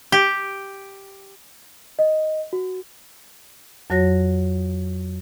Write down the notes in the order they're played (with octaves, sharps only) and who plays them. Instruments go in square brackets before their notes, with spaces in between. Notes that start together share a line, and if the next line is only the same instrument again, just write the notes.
[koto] G4
[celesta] D#5
F#4
[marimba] F2 F#3 F#4 C#5 A#6